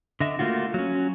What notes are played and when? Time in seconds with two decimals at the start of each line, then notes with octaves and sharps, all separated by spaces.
0.20 D3 D#5 E5
0.39 A3 A#3 C4 F4 F#4
0.74 F#3 C#4